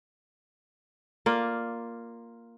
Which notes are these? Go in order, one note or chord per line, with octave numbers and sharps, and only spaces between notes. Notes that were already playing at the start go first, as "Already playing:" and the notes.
A#3 F4 D5